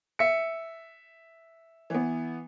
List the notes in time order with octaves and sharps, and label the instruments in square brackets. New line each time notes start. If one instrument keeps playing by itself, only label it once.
[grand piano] E5 C#7
[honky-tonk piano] E3 B3